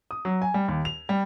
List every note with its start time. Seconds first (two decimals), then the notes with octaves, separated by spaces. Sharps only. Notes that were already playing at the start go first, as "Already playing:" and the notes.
0.11 D#6
0.25 F#3
0.42 G#5
0.54 G3
0.68 D#2
0.85 F7
1.09 G3